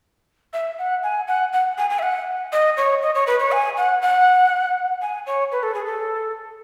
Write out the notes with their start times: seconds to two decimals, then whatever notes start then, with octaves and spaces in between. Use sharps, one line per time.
0.53 E5
0.78 F#5
1.03 G#5
1.28 F#5
1.53 F#5
1.78 G#5
1.90 G#5
1.99 E5
2.02 F#5
2.52 D#5
2.77 C#5
3.02 D#5
3.15 C#5
3.27 B4
3.40 C#5
3.52 G#5
3.77 F#5
4.02 F#5
5.02 G#5
5.26 C#5
5.52 B4
5.63 A4
5.74 G#4
5.85 A4